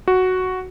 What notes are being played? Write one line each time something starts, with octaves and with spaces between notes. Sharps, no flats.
F#4